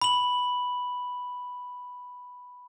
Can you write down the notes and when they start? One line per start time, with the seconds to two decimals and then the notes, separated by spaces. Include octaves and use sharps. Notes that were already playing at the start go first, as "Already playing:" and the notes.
0.02 B5 F#7